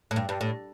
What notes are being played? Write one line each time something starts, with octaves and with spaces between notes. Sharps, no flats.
A2
G2
G2
A2